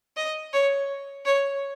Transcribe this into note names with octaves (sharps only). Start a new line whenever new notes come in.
D#5
C#5
C#5